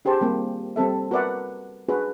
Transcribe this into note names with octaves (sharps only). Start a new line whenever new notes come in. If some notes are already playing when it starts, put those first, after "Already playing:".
D4 G4 G#4 C5 A5
G3 A#3 C4
G3 C4 A4 E5
F#4 A#4 B4 D5 E5 F#5
D4 F#4 G#4 B4